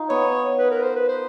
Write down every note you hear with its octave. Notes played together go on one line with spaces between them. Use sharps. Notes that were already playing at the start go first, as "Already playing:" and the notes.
Already playing: D#4 F4
B3 C#5
B4
A#4
C5
B4
C5